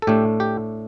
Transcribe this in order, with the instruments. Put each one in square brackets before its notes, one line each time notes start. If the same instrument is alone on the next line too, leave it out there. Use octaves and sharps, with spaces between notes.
[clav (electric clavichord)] A4
A2 A3 D4 G4
G4